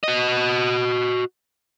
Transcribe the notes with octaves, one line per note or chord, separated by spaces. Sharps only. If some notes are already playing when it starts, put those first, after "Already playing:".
F#4 D#5